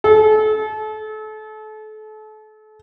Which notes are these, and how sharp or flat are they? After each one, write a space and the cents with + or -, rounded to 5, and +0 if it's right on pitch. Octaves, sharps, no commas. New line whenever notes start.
A4 -35